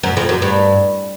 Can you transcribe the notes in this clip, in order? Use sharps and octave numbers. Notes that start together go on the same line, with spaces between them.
F#2
F2
F#2
G2